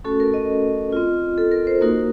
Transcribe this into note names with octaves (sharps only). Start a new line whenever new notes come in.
A3 C#4 F#4 A4
A#4
D#5
C4 F4
A4
A#4
C5
A#3 D#4 F#4 A#4